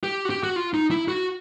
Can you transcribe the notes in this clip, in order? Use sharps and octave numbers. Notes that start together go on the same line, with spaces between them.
G4
F#4
G4
F#4
F4
D#4
E4
F#4